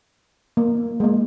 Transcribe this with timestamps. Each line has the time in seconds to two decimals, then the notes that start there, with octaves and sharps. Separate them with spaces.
0.57 A#3
1.00 G#3
1.04 A#3